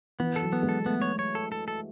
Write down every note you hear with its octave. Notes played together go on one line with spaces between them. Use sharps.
E3 B3
A4
F#3
B3
G#3
A4
A3 B3
C#5
C#5
A4
A4
A4